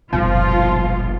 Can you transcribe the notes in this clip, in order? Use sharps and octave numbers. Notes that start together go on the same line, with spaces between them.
F#1 B1 A#2 F3 G3 F4